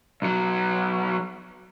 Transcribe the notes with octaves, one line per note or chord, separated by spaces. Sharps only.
B1 F#3